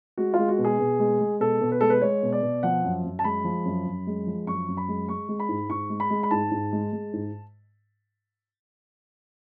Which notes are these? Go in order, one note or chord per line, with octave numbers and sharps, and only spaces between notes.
G#3 F#4
G#3 F4
F#4
B2
G#4
B2
G#3
G#3
B2 A4
B2
B4
G#3 A4
B4
G#3 C#5
B2
D5
B2
F3 F#5
F#2
F#2
A5
G#3 B5
F3
F#2
F#2
G#3
F3
F#2 C#6
F#2
B5
G#3
G#3 C#6
G#3
B5
G#2
G#2 C#6
G#3
B5
G#3
B5
G#2 A5
G#2
G#3
G#3
G#2